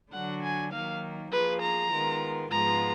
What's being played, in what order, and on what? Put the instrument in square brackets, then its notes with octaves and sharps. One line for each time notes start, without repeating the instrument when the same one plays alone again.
[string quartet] D3 F#3 D4 F#4 [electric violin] F#5
[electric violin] G#5
[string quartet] D#3 F#3 A#3 D#4 [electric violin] F5
[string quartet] F3 A#3 F4 G#4 [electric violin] B4
[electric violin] A#5
[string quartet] D#3 G#3 B3 F4 A#4
[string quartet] G#2 F3 G#3 B3 F4 [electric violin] A#5